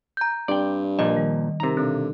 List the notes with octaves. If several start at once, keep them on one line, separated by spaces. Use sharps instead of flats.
A#5 G6
G2 C4 D5 G5
A#1 A#2 D#5
D#3 G3
C3 D#4 A#4 A#5
B2 D3 C4